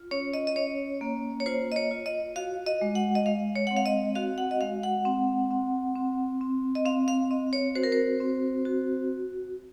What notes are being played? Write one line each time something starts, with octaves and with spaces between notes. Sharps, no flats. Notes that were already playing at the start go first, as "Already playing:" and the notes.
Already playing: F4
C#4 C#5
D#5
D#5
C#4 C#5
A#3
C#5
F4 C5
D#5
C#5
F4
D#5
F#4 F5
D#5
G#3
F#5
D#5
G#3 F5
C#5
C4 F#5
F5
D#5
F#4 F5
F#5
D#5
G#3 F5
F#5
C4
C4
C4
C4
D#5
C4 F5
F5
C4 D#5
C#5
F#4 C5
A#4
C5
C4
F#4